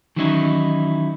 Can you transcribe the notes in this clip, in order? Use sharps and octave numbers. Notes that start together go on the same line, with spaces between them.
D#3 E3 F#3 C#4 D#4 E4